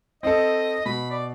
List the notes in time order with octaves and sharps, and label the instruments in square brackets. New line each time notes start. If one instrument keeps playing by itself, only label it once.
[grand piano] C4 D#4 A4 [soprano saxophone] D#5
[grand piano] B2 [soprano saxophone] B5
[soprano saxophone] D5